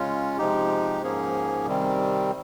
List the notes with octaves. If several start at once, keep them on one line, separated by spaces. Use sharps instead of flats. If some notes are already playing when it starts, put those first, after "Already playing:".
Already playing: C#3 G#3 C#4 F4
C3 F3 G#3 D#4 G4
G#2 F3 A#3 C#4 G#4
C3 D#3 G3 C4